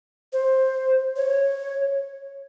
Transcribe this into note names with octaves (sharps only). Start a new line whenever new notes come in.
C5
C#5